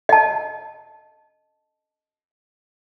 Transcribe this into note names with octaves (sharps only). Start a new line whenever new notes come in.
D#5 A5